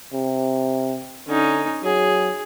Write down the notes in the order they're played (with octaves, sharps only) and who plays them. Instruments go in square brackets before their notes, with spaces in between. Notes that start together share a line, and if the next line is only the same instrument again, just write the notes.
[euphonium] C3
[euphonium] D3 [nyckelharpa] C#4 D#4
[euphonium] F#3 [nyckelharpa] G#4